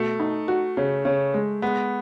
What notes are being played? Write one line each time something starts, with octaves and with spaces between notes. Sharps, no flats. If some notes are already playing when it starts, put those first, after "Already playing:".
Already playing: B2 A3
D#4
F#4
C#3
C#3
G#3
G#3 B3